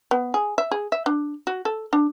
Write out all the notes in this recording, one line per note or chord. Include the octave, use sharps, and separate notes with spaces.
B3
G#4
E5
G#4
E5
D4
F#4
A4
D4